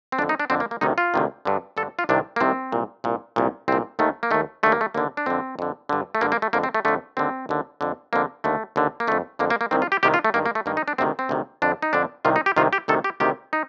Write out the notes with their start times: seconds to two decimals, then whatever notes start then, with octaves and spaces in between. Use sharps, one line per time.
0.12 C4
0.19 F2 D3 D4
0.29 D#4
0.40 D4
0.50 F2 D3 C4
0.60 A#3
0.71 A#3
0.81 D2 C3 D#3 D#4
0.98 F4
1.14 D2 C3 D#3
1.45 G2 D3
1.77 G2 D3 A4
1.99 F4
2.09 C2 C3 D#3 D4
2.36 A#3
2.41 C2 C3 D#3 C4
2.72 C2 A#2
3.04 C2 A#2
3.36 C2 A#2
3.68 C2 A#2 C4
3.99 D#2 D#3 A3
4.23 A#3
4.31 D#2 D#3 A3
4.63 D#2 D3 A3
4.72 A#3
4.81 A3
4.94 D#2 D3 A#3
5.17 D4
5.26 F2 D3 C4
5.59 F2 D3
5.89 G2 D3
6.15 A3
6.21 G2 D3 A#3
6.32 A#3
6.42 A3
6.53 F2 D3 A#3
6.64 C4
6.74 A3
6.85 F2 D3 A3
7.17 D#2 D3 C4
7.49 D#2 D3
7.81 F2 D3
8.13 F2 D3 A#3
8.44 D#2 D3 A3
8.76 D#2 D3
9.00 A#3
9.07 F2 D3 A3
9.39 F2 D3 A#3
9.50 A#3
9.61 A#3
9.71 C2 C3 D#3 C4
9.82 F4
9.92 G4
10.03 C2 C3 D#3 G4
10.14 F4
10.24 A3
10.34 G2 D#3 A#3
10.46 A#3
10.55 A3
10.66 G2 D#3 A#3
10.77 D#4
10.88 D4
10.98 D2 C3 D#3 C4
11.19 C4
11.29 D2 C3 D#3
11.62 F2 D3 D4
11.82 D#4
11.93 F2 D3 D4
12.25 C2 C3 D#3 F4
12.36 D#4
12.46 G4
12.56 C2 C3 D#3 F4
12.73 G4
12.88 D2 C3 D#3 A4
13.04 G4
13.20 D2 C3 D#3 G4
13.53 D#4